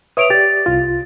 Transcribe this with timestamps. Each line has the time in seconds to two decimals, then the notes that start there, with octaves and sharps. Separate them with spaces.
0.17 B4 C#5 E5 D#6 D7 F7
0.30 G4 D5 A6
0.66 C2 F4